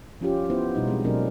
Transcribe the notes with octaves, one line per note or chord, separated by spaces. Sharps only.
F3 C#4 F4 G4
B3 E4 C5
B2 G3 D#4
G#3 C4
B2 F#3 A3 C4 D4 A#4